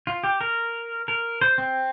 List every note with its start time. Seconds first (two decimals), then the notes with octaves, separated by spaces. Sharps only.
0.07 F4
0.24 G4
0.41 A#4
1.08 A#4
1.41 C5
1.58 C4